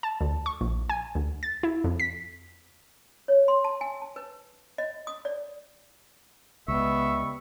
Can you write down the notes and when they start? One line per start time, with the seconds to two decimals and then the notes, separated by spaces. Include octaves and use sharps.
0.03 A5
0.21 D2
0.46 C#6
0.61 A#1
0.90 G#5
1.15 D2
1.43 A6
1.63 E4
1.84 F2
2.00 B6
3.28 C#5
3.48 C6
3.64 A5
3.81 G#5
4.02 A5
4.16 B4
4.78 D#5
5.07 D#6
5.25 D5
6.68 C#2 G3 B3 D#5 E5 C#6